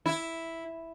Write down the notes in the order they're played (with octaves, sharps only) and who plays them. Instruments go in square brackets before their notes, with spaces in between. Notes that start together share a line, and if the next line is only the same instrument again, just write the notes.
[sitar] E4